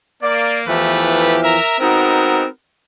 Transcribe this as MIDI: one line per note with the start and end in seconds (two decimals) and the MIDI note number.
0.23 0.65 58
0.23 0.58 74
0.68 1.57 40
0.68 1.57 52
0.68 1.57 53
0.68 1.37 57
0.68 1.37 67
0.68 1.37 71
1.44 1.77 70
1.44 1.77 76
1.44 1.77 82
1.80 2.49 56
1.80 2.49 59
1.80 2.45 60
1.80 2.45 63
1.80 2.45 66
1.80 2.49 70